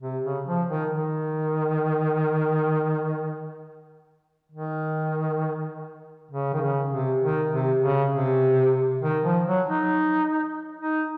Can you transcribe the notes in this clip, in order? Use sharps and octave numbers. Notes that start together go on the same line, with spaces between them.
C3
C#3
F3
D#3
D#3
D#3
C#3
D#3
C#3
C3
D#3
C3
C#3
C3
D#3
F3
F#3
D#4
D#4